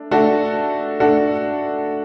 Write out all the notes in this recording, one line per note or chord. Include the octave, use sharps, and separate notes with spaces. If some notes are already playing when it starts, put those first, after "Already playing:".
Already playing: A3 D4
A3 D4 F#4 A4
A3 D4 F#4 A4